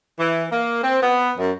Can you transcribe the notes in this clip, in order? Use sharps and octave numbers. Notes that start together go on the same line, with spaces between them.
E3
A#3
C4
B3
F#2